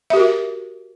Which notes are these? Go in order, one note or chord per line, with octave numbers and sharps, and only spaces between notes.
F#4 G4 A#4 E5